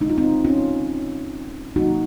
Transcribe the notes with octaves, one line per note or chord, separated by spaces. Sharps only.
C#3 G#3 D#4
F4
C4 D#4
C#4 F4
C3 F#3 A#3 D#4 F#4